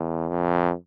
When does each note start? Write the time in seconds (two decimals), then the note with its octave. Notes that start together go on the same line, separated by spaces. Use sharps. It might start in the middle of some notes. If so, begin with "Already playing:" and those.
Already playing: E2
0.29 F2